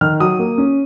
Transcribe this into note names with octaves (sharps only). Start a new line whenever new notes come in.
D#3 F6
F#3 D#6
A#3
C#4